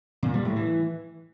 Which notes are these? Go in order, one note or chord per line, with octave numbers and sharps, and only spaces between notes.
A#2
G3
A2
E3